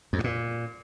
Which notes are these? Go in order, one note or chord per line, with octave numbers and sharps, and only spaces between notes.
F2
G2
A#2